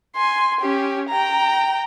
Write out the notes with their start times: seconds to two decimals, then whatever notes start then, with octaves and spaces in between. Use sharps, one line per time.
0.16 G#5 C6
0.61 C#4 G4
1.09 G5 A#5